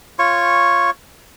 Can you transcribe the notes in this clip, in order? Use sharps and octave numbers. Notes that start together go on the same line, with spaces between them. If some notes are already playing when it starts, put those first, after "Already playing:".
F4 C#5 C#6